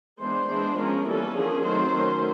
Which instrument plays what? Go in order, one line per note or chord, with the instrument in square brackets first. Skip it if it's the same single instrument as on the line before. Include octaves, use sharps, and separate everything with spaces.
[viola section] E3 G#3 B3 D4 C5
E3 G#3 B3 D4
F3 G#3 C#4 A#4
E3 G3 A#3 C#4 A4
D3 F3 A#3 C#4 G#4
D#3 F#3 A3 C4 C5
D#3 F#3 A3 C#4